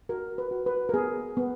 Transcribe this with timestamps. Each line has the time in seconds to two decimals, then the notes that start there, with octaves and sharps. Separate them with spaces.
0.09 F#4 A#4
0.38 B4
0.51 F#4
0.66 B4
0.89 A#4
0.94 B3 G#4
1.37 B3